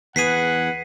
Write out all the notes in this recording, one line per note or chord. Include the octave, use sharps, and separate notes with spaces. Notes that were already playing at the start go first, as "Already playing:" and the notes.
E2 G#4 B4 F#5 B6 C7 D#7